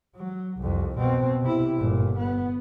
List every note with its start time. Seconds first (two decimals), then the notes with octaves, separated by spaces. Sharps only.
0.16 F#3
0.58 C2 F2
0.98 B2 C4
1.42 C3 E4
1.77 G1 A#2
2.18 B3